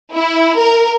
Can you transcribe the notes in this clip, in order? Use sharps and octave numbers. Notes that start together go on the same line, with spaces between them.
E4
A#4